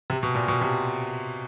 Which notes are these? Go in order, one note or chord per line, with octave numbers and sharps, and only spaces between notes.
C3
B2
A#2
B2
C3